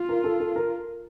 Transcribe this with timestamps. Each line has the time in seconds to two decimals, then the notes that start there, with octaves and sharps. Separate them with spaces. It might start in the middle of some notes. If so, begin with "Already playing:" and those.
Already playing: F4
0.09 A#4
0.24 A4
0.40 A4
0.56 A#4